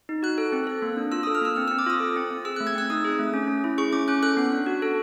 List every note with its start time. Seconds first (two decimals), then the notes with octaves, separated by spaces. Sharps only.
0.09 D#4
0.23 F#4 F#6
0.38 A4
0.52 C4
0.67 A4
0.82 A#3
0.97 D4
1.12 F4 E6
1.23 A4 D#6
1.35 F6
1.41 A#3 E6
1.56 C4 F6
1.68 C4 E6
1.79 D6
1.86 F4 D#6
2.00 A4
2.16 C4
2.30 C4
2.45 G#4 E6
2.56 A3 F#6
2.67 G#6
2.75 C4 E6
2.90 D#4 D#6
3.04 G#4
3.19 A3
3.34 C#4
3.48 C#4
3.64 E4
3.78 G#4 C#6
3.93 C#4 D6
4.08 C#4 F#6
4.23 A4 F#6
4.37 B3
4.52 D4
4.66 F#4
4.82 A4